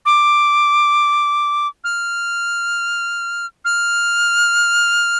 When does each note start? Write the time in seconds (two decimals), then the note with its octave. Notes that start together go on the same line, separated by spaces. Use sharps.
0.06 D6
1.84 F6
3.65 F6